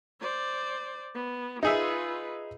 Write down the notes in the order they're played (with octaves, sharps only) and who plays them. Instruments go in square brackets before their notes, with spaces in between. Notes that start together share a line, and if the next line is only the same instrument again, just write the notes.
[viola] C5 D5
B3
[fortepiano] D#4 G#4 E5 [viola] F4 B4